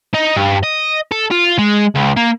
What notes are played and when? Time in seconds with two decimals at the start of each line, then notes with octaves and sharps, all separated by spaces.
0.14 D#4
0.36 G2
0.63 D#5
1.12 A4
1.31 F4
1.58 G#3
1.95 C#2
2.16 A#3